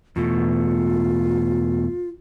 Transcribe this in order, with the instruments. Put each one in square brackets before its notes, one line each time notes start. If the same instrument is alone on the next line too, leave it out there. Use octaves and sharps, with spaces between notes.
[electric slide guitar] E2 B2 A3 [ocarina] F4